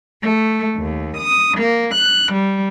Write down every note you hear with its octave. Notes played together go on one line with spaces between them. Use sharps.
A3
D#2
D#6
A#3
F#6
G3